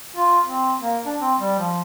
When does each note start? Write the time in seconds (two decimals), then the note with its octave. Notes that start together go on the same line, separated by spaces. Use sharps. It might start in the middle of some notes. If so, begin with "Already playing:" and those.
0.16 F4
0.45 C4
0.80 A#3
1.05 D4
1.20 C4
1.40 G3
1.59 F3